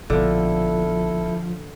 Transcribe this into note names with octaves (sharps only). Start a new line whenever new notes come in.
A#1 B2 D3 F3 E4 A4